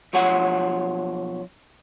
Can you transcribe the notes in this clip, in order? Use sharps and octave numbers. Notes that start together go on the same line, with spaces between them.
B1 F3 C#5 F#5